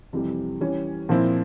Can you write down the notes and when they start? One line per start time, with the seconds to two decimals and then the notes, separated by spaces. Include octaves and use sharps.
0.13 F2 C3 E3 G3
0.61 E3 G3 C#4
1.09 A#2 F3 C4 E4